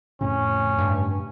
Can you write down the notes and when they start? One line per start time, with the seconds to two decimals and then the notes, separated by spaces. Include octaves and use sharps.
0.21 F2 A2 C#3 C#4
0.78 G2